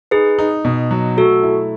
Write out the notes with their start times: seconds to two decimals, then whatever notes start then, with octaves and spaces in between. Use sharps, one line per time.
0.11 D#4 G#4 B4
0.39 D#4
0.65 B2
0.91 F#3
1.17 A3 F#4 A4
1.43 E4